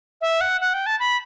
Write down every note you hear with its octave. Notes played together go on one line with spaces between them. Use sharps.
E5
F#5
F#5
G5
A5
B5